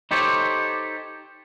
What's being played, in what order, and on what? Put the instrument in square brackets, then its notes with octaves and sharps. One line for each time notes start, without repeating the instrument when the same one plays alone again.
[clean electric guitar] D#4 G4 A4 C5 C#5